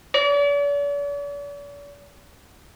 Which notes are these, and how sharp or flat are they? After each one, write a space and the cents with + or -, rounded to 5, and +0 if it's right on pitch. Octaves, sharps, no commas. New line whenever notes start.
D5 -45